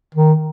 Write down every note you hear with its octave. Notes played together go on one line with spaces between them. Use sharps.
D#3